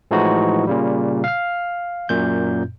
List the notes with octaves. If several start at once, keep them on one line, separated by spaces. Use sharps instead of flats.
A2 E3 F3 G#3 D#4 F#4
A#2 C#3 G3
F5 F6
F#2 A#2 G6